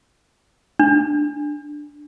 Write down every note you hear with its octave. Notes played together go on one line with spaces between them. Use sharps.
D4